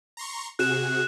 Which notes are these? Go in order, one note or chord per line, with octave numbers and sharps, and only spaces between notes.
A#5 C6 C#6
C3 F#4 G#4 F#6 E7